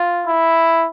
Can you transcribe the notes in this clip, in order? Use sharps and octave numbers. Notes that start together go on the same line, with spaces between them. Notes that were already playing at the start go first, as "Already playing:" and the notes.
Already playing: F4
E4